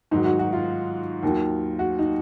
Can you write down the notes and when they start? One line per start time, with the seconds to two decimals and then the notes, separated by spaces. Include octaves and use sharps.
0.11 G#2 D#3 F#3 D#4
0.25 F#4
0.39 F#4
0.53 F4
1.23 D#2 D#3 F#3
1.79 F#4
1.99 D#4